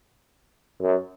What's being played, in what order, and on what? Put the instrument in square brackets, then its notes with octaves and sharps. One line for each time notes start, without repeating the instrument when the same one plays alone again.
[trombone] F#2